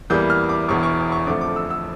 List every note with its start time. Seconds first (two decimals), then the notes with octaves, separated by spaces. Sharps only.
0.10 E2 E3 G3 A#3 G6
0.30 F6
0.49 D6
0.68 E1 E2 E3 C#6
0.83 C#6
1.12 C#6
1.27 F2 D3 F3 A3 D6
1.41 D6
1.56 E6
1.70 E6